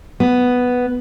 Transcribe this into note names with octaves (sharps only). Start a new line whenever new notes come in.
B3